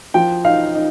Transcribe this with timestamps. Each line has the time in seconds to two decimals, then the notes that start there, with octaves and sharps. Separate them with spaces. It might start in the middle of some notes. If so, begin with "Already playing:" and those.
0.14 F3 G5
0.44 D#4 F5
0.75 D#4